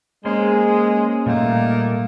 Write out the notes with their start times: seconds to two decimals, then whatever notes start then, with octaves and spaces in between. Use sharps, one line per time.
0.25 G#3 A#3 C#4 C5
1.26 A#2 G3 A3 A#3 D#4